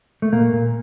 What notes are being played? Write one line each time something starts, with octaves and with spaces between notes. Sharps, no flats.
A3
A#2 A#3
A#2